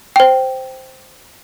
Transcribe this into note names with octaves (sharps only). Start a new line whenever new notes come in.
C5 G5